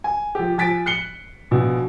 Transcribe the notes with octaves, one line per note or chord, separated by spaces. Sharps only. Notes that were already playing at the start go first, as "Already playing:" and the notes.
G#5
F3 G4
F3 G#5 A6 B6 D7
F#6 C7 C#7 G7
A#1 B2